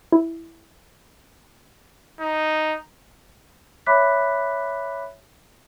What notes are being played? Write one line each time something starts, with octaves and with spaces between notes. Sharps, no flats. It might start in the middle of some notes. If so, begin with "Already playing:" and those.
E4
D#4
C#5 E5 B5 D6 F#6 B6